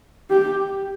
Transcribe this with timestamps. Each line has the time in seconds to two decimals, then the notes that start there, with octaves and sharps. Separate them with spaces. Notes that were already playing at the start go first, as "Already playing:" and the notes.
0.30 G4